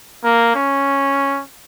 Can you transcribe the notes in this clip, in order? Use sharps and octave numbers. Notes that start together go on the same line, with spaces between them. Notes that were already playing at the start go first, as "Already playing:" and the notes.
A#3
C#4